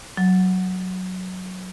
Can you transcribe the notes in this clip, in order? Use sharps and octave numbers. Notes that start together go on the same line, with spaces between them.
F#3